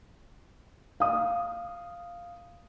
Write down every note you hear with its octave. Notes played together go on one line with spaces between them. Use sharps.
F5 D#6